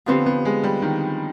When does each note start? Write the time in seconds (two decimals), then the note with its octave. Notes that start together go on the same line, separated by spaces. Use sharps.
0.06 D3 F3 B3 C4 G4 C5
0.26 B3
0.45 G#3
0.64 G3
0.82 D#3